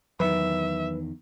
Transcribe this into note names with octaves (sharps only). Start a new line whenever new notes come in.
E2 D#3 F#3 B4 E5